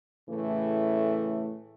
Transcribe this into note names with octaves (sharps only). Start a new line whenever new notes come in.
A2 C#3 E3 A3